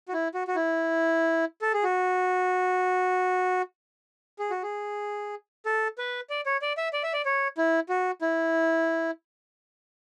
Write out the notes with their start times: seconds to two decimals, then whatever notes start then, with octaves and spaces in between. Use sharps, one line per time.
0.08 F#4
0.13 E4
0.34 F#4
0.48 F#4
0.56 E4
1.62 A4
1.74 G#4
1.84 F#4
4.39 G#4
4.50 F#4
4.63 G#4
5.66 A4
5.98 B4
6.30 D5
6.46 C#5
6.62 D5
6.77 E5
6.93 D5
7.03 E5
7.13 D5
7.25 C#5
7.58 E4
7.89 F#4
8.22 E4